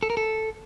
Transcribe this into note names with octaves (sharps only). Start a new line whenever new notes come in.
A4
A#4
A4